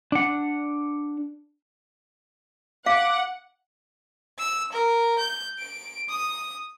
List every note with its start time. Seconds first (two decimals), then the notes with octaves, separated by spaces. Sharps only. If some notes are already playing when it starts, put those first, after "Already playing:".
0.12 D4 F#5
2.86 F5 F#5 D6
4.39 E6
4.73 A#4
5.18 G6
5.59 D7
6.09 D#6